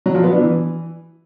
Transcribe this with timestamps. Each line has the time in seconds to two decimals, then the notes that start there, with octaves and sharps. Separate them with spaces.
0.06 F#3
0.15 F3
0.24 B3
0.32 D4
0.41 E3